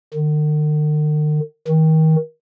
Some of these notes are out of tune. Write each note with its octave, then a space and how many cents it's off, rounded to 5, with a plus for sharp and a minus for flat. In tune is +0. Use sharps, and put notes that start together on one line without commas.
D#3 -45
D#3 +30